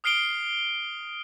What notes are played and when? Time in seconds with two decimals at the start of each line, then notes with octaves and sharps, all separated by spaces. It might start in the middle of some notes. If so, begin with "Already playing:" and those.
0.04 D#6 F6 C7 D7 G7